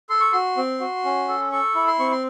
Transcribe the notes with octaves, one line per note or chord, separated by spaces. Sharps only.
A4 C6
C#6
F#4 C6
C4
F#4
C#4
A4
A4 C#6
E4
C6
C4 C#6
C6